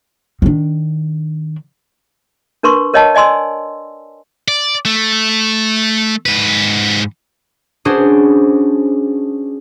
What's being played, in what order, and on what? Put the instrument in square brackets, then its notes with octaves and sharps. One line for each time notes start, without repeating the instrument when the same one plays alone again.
[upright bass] D#3 D4
[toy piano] D4 A#4 B4 C6 C#6
A#4 C#5 D#5 G5 A5
D5 D#5 G#5 C6 E6
[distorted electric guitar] D5
A3
G#2 B4
[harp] C#4 D4 F#4 G#4 C5